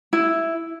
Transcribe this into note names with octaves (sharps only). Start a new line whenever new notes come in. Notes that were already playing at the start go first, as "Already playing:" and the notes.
E4